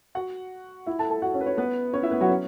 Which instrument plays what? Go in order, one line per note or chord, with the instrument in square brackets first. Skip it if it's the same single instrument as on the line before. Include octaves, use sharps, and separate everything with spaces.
[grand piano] F#4 F#5
E4 E5
A4 A5
A4 A5
F#4 F#5
C#4 C#5
B4
C#4 C#5
B3 B4
C#4 C#5
E4 E5
B3 B4
F#3 F#4
C#4